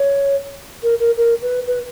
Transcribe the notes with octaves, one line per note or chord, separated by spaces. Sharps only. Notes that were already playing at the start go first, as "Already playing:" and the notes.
Already playing: C#5
A#4
A#4
A#4
B4
B4